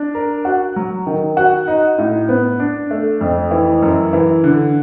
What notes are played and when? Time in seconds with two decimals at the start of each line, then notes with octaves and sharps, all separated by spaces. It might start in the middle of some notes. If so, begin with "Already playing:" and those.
Already playing: D4
0.15 A#4
0.45 F#4
0.76 F#3
1.06 D#3
1.37 F#4
1.68 D#4
1.98 A2
2.29 B3
2.60 D4
2.91 A3
3.21 F2
3.51 E3
3.82 F#2
4.13 E3
4.44 D3